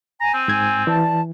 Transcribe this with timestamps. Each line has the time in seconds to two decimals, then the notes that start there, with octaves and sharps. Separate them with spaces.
0.21 G#5 A#5
0.34 C4
0.48 G#2 G#6
0.87 E3 D5 A5